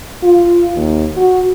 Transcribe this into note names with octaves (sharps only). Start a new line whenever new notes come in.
F4
D#2
F#4